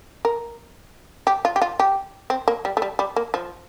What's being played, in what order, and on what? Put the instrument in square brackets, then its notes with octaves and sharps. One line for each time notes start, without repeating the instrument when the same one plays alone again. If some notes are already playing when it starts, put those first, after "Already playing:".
[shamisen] A#4
G4
F4
G4
F4
G4
C4
A#3
G3
A3
G3
G3
A#3
F3